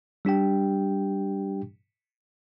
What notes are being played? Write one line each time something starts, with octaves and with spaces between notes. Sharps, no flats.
G3 D4 G4 G5